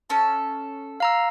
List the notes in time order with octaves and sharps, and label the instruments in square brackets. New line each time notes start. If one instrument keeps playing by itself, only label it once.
[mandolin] C#4 A4 A5
[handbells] F5 A#5 E6